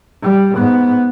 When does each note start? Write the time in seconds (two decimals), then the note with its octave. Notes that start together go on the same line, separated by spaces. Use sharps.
0.23 G3
0.56 G#2 B3